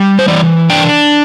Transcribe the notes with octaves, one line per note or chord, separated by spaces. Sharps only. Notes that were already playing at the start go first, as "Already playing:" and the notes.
Already playing: G3
C5
E3 D5
D4 G5